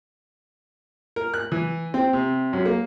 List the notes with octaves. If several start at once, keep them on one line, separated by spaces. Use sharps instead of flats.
A#4
F#6
E3
C4
C3
F#2
A#3